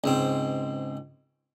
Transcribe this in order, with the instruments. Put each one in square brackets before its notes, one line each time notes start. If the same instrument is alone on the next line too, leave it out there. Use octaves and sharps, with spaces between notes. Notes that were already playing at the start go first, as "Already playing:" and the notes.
[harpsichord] C#2 G#2 C4